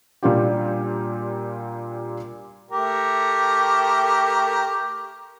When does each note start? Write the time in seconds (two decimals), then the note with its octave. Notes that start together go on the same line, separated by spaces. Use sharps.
0.23 A#2 G3 A#3 D4 F4 G4
2.71 A3 G4 A#4